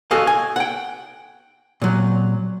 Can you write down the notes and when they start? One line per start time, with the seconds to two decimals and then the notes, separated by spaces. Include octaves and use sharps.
0.11 F#4 A4 D#5 F5 G#5
0.27 G#5
0.56 F#5 G5
1.82 A#2 F#3